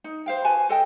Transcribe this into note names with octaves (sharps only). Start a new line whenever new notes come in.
D#4
C5 F5 G5
F#4 B4 G#5 A5
A4 D#5 G5 A5